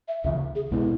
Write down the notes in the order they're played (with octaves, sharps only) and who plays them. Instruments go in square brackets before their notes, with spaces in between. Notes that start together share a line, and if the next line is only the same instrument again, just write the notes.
[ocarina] E5
[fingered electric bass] C#2 C#3 E3 [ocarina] E5
[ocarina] G#4
[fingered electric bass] C#2 B2 G#3 B3 [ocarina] E4